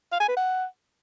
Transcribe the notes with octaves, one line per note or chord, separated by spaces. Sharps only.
F5
G#5
B4
F#5